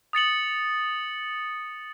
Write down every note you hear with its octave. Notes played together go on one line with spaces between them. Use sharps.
D#6 A6 C#7 F#7